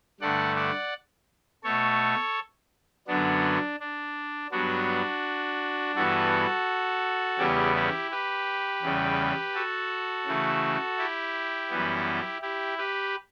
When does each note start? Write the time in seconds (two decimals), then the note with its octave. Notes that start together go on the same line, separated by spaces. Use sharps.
0.20 G2 D3 A3 D5 F#5
0.56 D5 F#5
1.64 B2 A3 A4 C#5
3.08 F#2 D3 F#3 B3 D4
3.80 D4
4.51 G2 F#3 B3 D4 F#4
5.95 G2 E3 B3 F#4 A4
7.38 E2 C#3 G3 B3 E4 G4
7.75 E4 G4
8.11 G4 B4
8.82 E2 C#3 G3
9.54 F#4 A4
10.26 C#3 E3 A3
10.98 E4 G4
11.70 F#2 E3 G3 B3
12.42 E4 G4
12.78 G4 B4